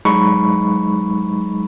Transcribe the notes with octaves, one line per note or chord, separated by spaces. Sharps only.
F#3 G#3 D#4 A#5 B5 C#6